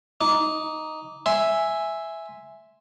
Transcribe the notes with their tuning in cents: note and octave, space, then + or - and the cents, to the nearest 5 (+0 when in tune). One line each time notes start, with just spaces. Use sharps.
D#4 +0 D6 -15
E5 +0 G#5 +0 C6 +0